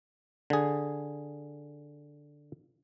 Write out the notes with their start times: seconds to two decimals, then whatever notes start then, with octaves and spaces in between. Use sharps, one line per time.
0.50 D3 G#4